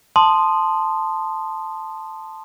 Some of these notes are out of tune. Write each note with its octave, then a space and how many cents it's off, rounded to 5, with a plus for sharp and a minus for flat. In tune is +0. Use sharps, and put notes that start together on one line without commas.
A5 +0 C6 -5 D#6 -20